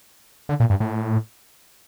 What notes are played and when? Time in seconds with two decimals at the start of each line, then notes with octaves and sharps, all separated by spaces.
0.49 D3
0.60 A#2
0.70 G2
0.80 A2